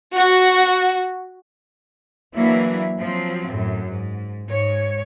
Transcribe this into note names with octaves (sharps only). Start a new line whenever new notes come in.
F#4
E3 F#3 A#3 D4 E4
F3 F#3 C4
F#2 A2
G#2
G#2 C#5